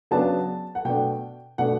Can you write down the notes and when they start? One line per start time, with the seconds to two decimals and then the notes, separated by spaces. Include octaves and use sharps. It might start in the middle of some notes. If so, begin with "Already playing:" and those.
0.11 C#3 F#3 B3 D4 A5
0.75 F#5
0.85 B2 A3 D4 G5
1.58 B2 A3 D4 F#5